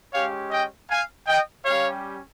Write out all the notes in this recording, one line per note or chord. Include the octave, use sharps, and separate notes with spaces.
G#3 C#4 G4 C#5 F5
D#5 G5
F5 G#5
D#5 G5
G3 C#4 G4 C#5 F5